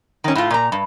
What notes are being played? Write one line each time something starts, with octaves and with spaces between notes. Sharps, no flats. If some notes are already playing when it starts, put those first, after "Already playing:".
D#3 C#4
A2 F4
A#2 A#5
G2